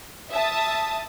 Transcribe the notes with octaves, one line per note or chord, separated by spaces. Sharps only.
E5 A5 D#6 A6